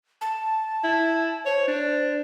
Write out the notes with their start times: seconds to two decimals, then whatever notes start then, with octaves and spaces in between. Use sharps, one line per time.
0.21 A5
0.83 E4
1.46 C5 C#5
1.68 D4